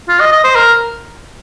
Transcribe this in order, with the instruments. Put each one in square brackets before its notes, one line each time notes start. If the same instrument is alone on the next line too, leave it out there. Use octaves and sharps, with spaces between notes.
[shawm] F4
D#5
D#5
C5
A#4